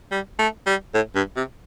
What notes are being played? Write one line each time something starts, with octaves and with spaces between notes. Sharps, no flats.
G3
A3
G3
A2
G2
C3